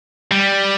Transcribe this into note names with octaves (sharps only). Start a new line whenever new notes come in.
G3